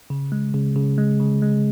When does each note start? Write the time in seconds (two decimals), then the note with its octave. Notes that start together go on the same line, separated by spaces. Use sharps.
0.10 C#3
0.32 G#3
0.54 C#3
0.76 C#3
0.98 G#3
1.20 C#3
1.42 G#3